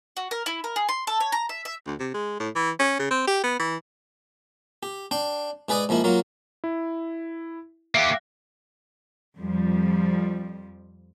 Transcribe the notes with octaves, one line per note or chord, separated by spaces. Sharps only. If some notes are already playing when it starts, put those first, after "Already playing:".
F#4
A#4
E4
A#4
G#4
C6
A4
C#5
A#5
E5
E5
D2
C3
G#3
A2
E3
C#4
C#3
C4
G4
B3
E3
G4
D4 G5 C6
G#2 G#4 B4 D5 G#5 D#6
G#2 F3 A#3 E4
F#3 A#3 F4
E4
A#3 G4 E5 F5 F#6
F2 F3 G3